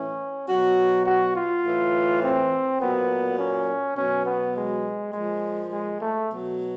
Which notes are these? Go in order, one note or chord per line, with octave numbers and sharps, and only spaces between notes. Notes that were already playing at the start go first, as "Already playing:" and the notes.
Already playing: A2 E3 C#4
B2 F#3 F#4
F#4
F4
A2 E3
C4
A#2 F#3 B3
C#4
B2 F#3 C#4
B3
G#3
A#2 F3 G#3
G#3
A3
B2 F#3